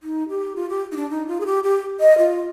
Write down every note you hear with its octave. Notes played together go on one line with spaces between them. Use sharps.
D#4
G4
F4
G4
D#4
D4
D#4
F4
G#4
G4
G4
D#5
F4